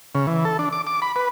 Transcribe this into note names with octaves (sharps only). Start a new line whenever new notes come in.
C#3
E3
A4
D4
D6
D6
B5
B4